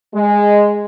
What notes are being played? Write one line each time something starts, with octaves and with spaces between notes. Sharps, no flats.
G#3